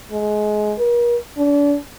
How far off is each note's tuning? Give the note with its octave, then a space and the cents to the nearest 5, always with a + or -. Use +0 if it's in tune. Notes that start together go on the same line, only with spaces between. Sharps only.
G#3 +20
A#4 +40
D4 -35